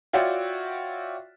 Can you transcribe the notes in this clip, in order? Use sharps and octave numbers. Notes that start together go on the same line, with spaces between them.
F4 F#4 C#5 D5 E5 G5